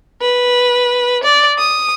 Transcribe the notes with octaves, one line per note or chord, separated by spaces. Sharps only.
B4
D5
D#6